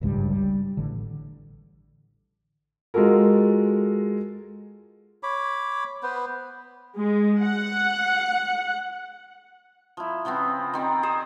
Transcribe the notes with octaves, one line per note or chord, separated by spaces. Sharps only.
G#1 C#2 G2 G3
G3
A1 D3
G#3 F4 F#4 A4 A#4
C#5 B5 D6
B3 B4 C5
G#3
F#5
F3 E4
C#3 F3 B3 C4
D#3 C4 D5
G#4 C5